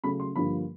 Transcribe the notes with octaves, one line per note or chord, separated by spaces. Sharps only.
C#3 F#3 A3 B5
C6
G2 D3 F3 A#3 B5